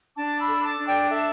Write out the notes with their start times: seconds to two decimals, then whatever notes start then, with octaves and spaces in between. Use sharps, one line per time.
0.16 D4 A5 D6
0.40 B5 E6
0.47 A4
0.64 A5 D6
0.79 D4
0.87 D5 G5
1.10 A4 E5 A5